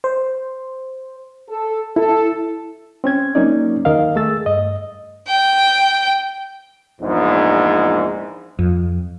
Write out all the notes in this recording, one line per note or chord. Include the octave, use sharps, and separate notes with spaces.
C5
A4
E4 A4
C4 C#4 G#6
F#3 A#3 C#4 D#4 D5
D#2 D#3 A#4 D#5 F5
A3 G#4 E6 A6
G2 D#5
G5
A#1 E2 G#2
F2